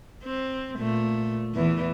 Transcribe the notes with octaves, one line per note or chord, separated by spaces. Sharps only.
C4
A#2 A3
E2 E3